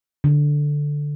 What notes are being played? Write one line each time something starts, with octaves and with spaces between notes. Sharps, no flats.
D3